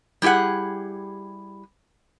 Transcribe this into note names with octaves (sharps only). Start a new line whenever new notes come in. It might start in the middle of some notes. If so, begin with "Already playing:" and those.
G3 E4 G4 G#4 F#5